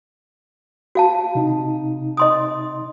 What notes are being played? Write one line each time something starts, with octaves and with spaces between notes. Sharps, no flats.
F#4 F5 A5
C3 D#4
D#5 C6 D#6